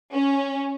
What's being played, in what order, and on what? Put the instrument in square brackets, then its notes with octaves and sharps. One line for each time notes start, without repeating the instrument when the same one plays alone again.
[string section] C#4